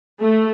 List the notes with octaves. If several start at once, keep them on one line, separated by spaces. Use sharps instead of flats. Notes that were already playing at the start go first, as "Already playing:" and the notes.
A3